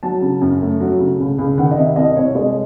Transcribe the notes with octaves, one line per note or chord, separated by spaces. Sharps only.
F#3 A5
C#3
F#2
A3
F#3
C#3
C#2
C#2
D#3 F#5
D#5
C3 E5
C2 D#5
C2 C#5
G#3 D#5